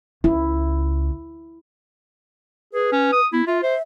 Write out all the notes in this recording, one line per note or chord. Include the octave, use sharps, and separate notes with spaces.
C#2 E4
G#4 B4
C#4
D#6
B3 E4
F4 E5
C5 E5